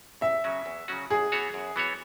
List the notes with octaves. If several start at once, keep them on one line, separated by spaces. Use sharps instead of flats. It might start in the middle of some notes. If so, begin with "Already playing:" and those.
E2 E5
C#3 F#3 C#4 F#4
E2
C#3 F#3 C#4 F#4
F#2 G#4
E3 B3 F#4 C#5
F#2
E3 B3 F#4 C#5